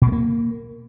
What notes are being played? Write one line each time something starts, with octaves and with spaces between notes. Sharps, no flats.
B2
G#3
A#3